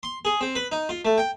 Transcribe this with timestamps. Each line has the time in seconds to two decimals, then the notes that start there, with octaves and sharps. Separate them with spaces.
0.03 C6
0.25 G#4
0.41 C4
0.55 B4
0.72 D#4
0.89 F4
1.05 A3
1.18 G5